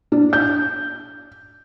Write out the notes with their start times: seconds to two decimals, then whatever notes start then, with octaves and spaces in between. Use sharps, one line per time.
0.12 D4
0.33 G6